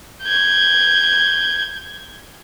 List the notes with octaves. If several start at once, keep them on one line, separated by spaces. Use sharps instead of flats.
G6 G#6